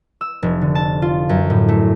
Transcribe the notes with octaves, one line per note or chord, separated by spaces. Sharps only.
E6
F1
D3
A5
F4
F#2
A2
A3